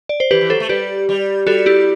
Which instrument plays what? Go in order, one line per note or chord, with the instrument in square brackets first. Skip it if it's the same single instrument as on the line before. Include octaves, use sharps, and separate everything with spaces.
[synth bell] D5
C5
[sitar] E3 [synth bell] G4 B4
[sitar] E3
[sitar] F#3 [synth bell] A4 C5
[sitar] A3
[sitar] G3 [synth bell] G4 B4
[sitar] G3
[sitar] G3 [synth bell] F#4 A4
[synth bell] E4 G4